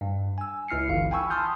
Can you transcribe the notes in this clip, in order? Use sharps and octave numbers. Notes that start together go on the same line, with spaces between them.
G2
G#5 E6
C#2 E4 F6 C7 C#7
G1 E3 F5
G5 G#5 B5 C#6 E6
A5 B5 C6 D#6 F6 G6